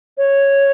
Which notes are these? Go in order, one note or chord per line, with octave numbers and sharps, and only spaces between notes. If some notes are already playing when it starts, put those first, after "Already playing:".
C#5